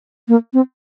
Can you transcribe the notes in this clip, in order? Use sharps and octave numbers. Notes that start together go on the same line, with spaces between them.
A#3
C4